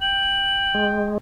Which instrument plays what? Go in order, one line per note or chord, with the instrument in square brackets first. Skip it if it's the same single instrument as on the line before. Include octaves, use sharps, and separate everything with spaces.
[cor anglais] G5 [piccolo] F#7
[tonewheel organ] G#3